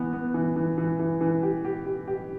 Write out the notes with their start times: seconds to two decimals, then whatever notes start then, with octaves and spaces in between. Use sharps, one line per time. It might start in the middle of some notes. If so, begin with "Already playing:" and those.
Already playing: E3 B3
0.13 B3
0.34 E3
0.56 E3
0.78 E3
0.99 E3
1.21 E3
1.43 G4
1.65 G4
1.86 G4
2.07 G4